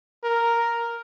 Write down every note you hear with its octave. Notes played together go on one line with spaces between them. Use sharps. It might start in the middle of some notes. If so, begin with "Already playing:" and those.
A#4